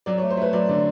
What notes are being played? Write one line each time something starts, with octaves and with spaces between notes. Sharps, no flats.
F#3 D5
C#5
A3
C5
A3 B4
F#3 D5
D3 D5